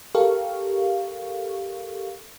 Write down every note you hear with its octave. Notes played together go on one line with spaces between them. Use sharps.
G4 A4 A#4 F5 C#6